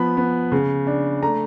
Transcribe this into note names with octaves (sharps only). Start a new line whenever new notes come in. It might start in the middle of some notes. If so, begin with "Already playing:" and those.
Already playing: F3 B3 B5
B3
C#3
D4
A3 A#5